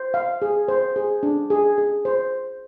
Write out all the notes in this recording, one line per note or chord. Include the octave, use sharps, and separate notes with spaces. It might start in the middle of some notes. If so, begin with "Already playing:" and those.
Already playing: C5
F5
G#4
C5
G#4
D4
G#4
G#4
C5